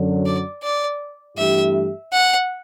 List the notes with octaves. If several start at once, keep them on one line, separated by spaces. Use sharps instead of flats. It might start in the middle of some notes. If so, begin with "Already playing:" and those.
Already playing: F#2 D3 F#3
D5
D5
G2 E3 A3 E4 G4 E5
F#5